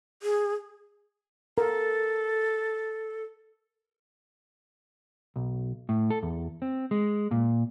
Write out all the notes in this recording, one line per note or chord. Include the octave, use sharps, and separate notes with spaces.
G#4
A4 A#4
B1
A2
A4
E2
C4
G#3
A#2